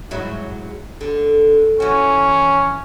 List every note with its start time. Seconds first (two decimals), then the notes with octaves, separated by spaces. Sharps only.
0.11 G#2 F#3 E4
1.01 D3
1.80 E3 C#4 F#4